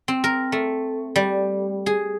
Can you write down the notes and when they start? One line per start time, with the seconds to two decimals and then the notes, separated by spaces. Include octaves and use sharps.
0.08 C4
0.24 A#4
0.52 A3
1.16 G3
1.86 G#4